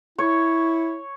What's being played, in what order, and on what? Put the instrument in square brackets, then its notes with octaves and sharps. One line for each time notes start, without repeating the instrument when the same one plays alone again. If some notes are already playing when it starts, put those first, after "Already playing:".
[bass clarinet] E4 [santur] C#5